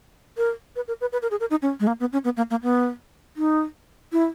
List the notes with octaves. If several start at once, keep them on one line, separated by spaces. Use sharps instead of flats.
A#4
B4
A#4
B4
B4
A#4
G#4
A#4
D#4
C#4
G#3
A#3
B3
C#4
B3
A#3
A#3
B3
D#4
E4